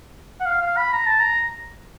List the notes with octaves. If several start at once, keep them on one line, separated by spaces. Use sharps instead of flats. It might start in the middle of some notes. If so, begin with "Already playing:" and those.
F#5
F5
F5
B5
A#5
A5
A#5